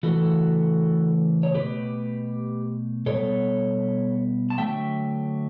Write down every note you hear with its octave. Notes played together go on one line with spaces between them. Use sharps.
C#3 E3 A3 F#4 A4
C#5
B2 A3 G4 B4
B2 G3 B3 A4 C#5
A5
D3 F#3 A3 E5 G5